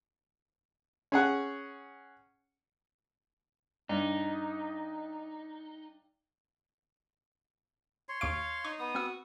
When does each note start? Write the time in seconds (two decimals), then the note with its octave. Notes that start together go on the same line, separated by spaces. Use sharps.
1.12 C#4 G#4 F#5
3.89 G2 D#4
8.09 C#5 C6
8.21 D#2 F5 C#6 D7
8.65 D#4 C#6
8.79 B3 D#6
8.95 C4 F#4 E6